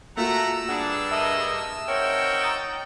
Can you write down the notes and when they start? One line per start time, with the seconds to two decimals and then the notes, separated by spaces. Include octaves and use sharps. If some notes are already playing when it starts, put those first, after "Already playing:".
0.17 A3 A#3 F4 F#4 F#5 A#5 E6
0.69 G2 D4 G#4 F#5
1.11 A#3 A#4 D#5 E5 A5 D#6
1.89 C4 D#4 A#4 C#5 F#5 G5
2.43 A#5 D#6 A6